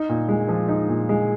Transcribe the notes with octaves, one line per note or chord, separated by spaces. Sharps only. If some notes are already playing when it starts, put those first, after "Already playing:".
Already playing: D#4
A#2
G#3
F3
D#4
A#2
G#3